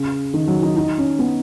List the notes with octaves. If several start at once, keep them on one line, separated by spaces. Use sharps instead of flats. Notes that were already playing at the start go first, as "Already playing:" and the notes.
Already playing: C#3
D#3
F#3
D#4
D#4
C#4
B3